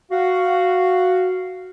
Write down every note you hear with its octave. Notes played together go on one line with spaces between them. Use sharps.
F#4 F5